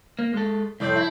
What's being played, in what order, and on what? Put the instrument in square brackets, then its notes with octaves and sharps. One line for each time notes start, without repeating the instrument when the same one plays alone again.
[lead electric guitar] A#3
G#3 A4
[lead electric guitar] C2 F2 [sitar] A2 C4 D5
[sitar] E4